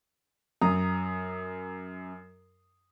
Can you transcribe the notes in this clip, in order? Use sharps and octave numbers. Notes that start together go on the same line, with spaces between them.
F#2 A#5 D#6